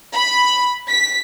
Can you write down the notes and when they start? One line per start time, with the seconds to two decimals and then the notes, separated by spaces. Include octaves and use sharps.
0.14 B5
0.90 B6